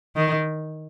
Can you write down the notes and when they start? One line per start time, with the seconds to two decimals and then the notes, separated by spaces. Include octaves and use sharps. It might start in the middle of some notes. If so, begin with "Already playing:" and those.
0.16 D#3